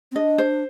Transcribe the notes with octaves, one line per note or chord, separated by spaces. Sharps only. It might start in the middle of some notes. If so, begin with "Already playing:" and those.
C4
D4 D#5
C5